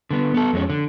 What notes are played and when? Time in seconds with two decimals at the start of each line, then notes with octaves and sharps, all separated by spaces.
0.11 D3 B3
0.34 B3 A4
0.53 F2 G#3 C#4
0.70 D3